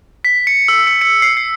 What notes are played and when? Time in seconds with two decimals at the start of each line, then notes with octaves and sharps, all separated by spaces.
0.25 B6
0.47 C#7
0.68 E6
0.87 C#7
1.01 C#7
1.22 C7
1.37 C7